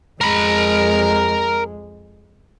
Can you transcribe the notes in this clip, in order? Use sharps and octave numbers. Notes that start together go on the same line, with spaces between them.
F2 G#3 A#4 B5